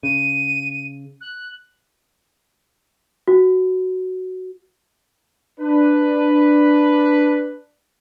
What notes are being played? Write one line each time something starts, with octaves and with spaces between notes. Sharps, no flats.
C#3 D#7
F#6
F#4
D4 B4